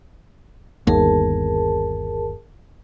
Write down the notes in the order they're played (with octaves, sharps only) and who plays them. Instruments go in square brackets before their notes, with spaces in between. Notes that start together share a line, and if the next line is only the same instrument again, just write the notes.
[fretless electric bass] G1 D#2 [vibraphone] G#4 A#4 A5